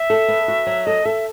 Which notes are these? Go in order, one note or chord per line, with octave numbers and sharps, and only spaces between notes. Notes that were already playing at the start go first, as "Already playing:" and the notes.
Already playing: E5
A4
B3
F#4
F#3
A4 D#5
A4 E5